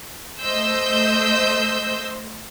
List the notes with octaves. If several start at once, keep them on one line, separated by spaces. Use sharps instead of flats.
A3 C5 D#5 E6 G6